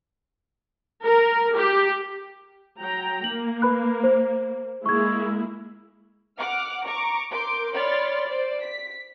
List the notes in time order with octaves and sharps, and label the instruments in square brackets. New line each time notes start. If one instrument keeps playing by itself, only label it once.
[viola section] A#4
G4
F#3 G5 A#5
[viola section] A#3 [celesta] F#7
[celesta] B4 B5 F#6
C5
[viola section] G#3 A#3 E4 [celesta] C#6 G#6
[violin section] F#5 D6 F6
A#5 C#6 D6
A#4 C6 D6 G6 D7
C#5 D5 B5 C6 F6 A6
C5 D5
B6